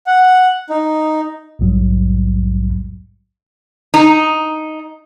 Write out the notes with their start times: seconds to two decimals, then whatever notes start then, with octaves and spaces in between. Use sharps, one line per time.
0.07 F#5
0.70 D#4
1.59 A#1 E2 G#2 F#3 G3
3.94 D#4